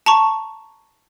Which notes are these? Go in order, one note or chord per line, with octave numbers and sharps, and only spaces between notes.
A5 A#5 C#6